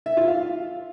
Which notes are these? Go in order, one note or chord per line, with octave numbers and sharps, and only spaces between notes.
E5
F4
F5